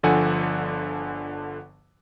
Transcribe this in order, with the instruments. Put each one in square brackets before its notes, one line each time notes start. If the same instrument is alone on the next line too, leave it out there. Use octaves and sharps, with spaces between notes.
[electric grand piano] G1 D3 F3 A4 F#5 G#5